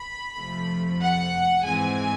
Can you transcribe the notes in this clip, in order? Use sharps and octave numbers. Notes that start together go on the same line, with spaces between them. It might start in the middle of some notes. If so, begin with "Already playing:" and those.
Already playing: B5
F2 C3 F3 A3
F#5
G#2 E3 G#3 C4 G#5